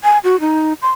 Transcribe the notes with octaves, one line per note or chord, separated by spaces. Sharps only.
G#5
F#4
D#4
C6